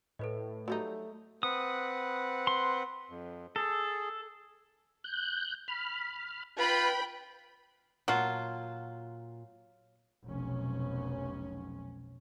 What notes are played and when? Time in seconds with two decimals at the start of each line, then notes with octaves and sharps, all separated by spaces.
0.19 A2 A4 B4 D#5
0.68 F#3 G3 A3 D#4
1.43 C4 B4 F#5 D#6
2.47 C6
3.10 F2
3.56 G#4 A4
5.04 F#6 G6
5.68 B5 F6
6.59 F4 B4 G5 B5
8.08 A#2 F#3 F4 F#5 A5
10.26 F1 B1 C#4